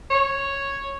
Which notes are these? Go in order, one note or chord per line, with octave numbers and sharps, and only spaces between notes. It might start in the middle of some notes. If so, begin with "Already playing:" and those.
C#5